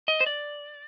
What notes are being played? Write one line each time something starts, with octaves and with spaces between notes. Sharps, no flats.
D#5
C5
D5